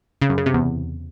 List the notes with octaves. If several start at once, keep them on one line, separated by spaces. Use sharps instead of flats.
C#3
F#2
C#3
C3
E2